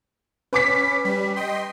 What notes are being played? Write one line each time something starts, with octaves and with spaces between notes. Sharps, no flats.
C#4 B4 D6 B6
G3
D#5 G5 C6